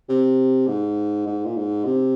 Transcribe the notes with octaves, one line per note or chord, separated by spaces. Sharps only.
C3
G#2
G#2
A#2
G#2
C3